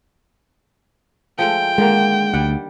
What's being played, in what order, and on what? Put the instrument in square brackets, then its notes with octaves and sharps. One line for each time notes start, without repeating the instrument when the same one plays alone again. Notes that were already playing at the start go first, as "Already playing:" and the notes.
[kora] F3 G#3 A3 [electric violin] G5
[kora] D3 D#3 A#3 [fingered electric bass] G#3
[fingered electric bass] D2 [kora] G3 F#5